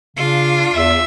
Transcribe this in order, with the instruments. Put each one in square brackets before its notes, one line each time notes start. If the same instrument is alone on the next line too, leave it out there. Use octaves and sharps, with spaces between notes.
[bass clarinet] C#3 [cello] D4 F4
[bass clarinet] E2 [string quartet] E5